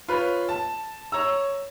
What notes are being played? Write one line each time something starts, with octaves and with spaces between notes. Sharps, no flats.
F4 B4 C#5
A5
C#5 A#5 E6